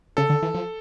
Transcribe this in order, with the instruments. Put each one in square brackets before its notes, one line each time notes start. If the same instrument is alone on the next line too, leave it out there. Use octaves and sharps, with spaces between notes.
[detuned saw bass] C#3 [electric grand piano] A4
[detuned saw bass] D3
E3
F3